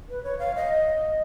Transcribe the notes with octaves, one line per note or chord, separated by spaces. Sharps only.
B4
C#5
F5
D#5